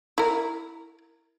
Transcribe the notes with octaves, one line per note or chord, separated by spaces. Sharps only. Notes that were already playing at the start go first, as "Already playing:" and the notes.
E4 A#4